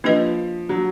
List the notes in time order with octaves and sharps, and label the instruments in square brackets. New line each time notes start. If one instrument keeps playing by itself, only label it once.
[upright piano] F3 [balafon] A#3 D4 G4 B4 D#5
[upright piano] F#3